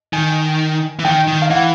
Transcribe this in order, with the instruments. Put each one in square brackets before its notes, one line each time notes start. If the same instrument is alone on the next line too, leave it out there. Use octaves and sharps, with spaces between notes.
[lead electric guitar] D#3 [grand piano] G#5
[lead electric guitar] E3
[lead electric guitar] D#3 [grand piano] G5
[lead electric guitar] D#3
[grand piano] F5
[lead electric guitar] E3 [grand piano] F#5